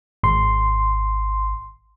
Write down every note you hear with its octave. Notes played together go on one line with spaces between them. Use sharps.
G#1 C6